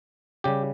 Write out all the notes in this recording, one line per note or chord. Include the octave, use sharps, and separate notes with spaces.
C#3 G3 G4